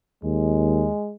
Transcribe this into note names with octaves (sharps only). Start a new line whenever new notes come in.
D#2 G#3